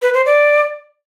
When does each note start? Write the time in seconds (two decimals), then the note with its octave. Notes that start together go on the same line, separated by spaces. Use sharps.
0.02 B4
0.14 C5
0.26 D5